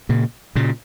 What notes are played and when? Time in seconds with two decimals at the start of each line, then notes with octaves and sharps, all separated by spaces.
0.09 A#2 C#3
0.56 A#2 C#3